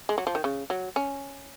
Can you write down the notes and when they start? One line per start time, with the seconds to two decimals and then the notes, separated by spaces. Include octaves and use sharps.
0.09 G#3
0.18 F#3
0.27 F3
0.35 D#3
0.44 C#3
0.70 F#3
0.96 C#4